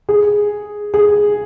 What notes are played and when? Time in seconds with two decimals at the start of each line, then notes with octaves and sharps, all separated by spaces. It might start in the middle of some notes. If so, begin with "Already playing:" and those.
0.09 G#4
0.94 G#4